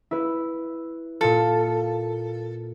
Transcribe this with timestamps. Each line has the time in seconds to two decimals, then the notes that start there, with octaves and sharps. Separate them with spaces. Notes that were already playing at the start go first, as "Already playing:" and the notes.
0.11 E4 B4
1.21 A#2 F4 A4